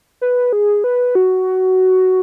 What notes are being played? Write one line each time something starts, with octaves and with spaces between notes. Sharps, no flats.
B4
G#4
B4
F#4